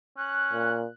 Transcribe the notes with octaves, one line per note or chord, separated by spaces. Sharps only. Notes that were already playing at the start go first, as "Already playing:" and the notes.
C#4 F#6
A#2